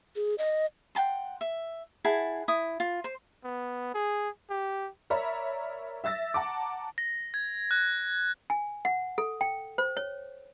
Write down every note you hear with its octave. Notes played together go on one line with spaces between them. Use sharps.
G#4
D#5
F#5 G5 A5 C6
E5
E4 G#4 F#5 A5
E4 D#6
F4
C5
B3
G#4
G4
A#4 C#5 D5 E5 A#5 B5
E5 E6 A6 A#6
F#5 A5 A#5 D6
A#6
G#6
F#6
G#5
F#5
A4
G5
C5
C#5